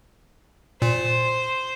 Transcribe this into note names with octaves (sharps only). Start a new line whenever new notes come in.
A#2 C5